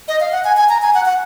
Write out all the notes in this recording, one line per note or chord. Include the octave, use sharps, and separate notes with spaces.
D#5
F5
F#5
G#5
G#5
A#5
G#5
F#5
F#5